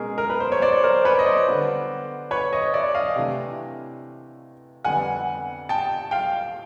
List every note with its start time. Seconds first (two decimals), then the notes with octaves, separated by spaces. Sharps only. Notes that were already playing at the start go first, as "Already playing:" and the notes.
Already playing: B2 G#3 C#4 G#4 A#4
0.18 A#4
0.30 B4
0.40 C5
0.52 C#5
0.62 C5 D5
0.84 A#4 C5
1.05 B4 C#5
1.19 D#5
1.26 C5 D5
1.47 D3 G3 B3 D4
2.31 B4 C#5
2.53 C#5 D#5
2.73 D5 E5
2.95 D#5 F5
3.16 C3 E3 A3 D4
4.84 F2 D3 G3 B3 F#5 G#5
5.69 G5 A5
6.11 F5 G5